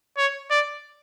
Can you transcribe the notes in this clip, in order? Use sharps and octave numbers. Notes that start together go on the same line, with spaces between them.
C#5
D5